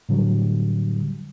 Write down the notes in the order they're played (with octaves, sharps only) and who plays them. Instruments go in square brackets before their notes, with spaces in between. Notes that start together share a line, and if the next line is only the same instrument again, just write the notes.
[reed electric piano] A2 D3 F#3 G3